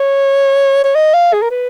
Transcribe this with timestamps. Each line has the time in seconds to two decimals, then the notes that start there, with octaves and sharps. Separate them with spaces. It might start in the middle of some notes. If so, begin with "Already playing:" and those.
Already playing: C#5
0.84 C#5
0.95 D#5
1.13 F5
1.33 G#4
1.42 A#4
1.50 B4